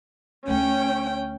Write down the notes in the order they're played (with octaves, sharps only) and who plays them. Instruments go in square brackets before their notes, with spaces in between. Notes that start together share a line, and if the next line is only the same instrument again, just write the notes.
[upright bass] D2 A3 [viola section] C#4 [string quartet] G5